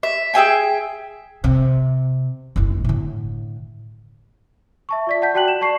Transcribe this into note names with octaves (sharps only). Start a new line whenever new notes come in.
E5
G#4 E5 G5 G#5
C3
F#1 E4
A2 D3
E5 A5 C#6
F4 D5 B6
F#5 A5 G6 B6
F#4 D5 G5 A5 F#6 F#7
E7
D5 A5 C#6 C7